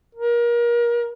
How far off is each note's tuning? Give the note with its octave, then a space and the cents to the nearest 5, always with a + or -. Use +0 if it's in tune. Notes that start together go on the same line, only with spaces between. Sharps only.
A#4 +30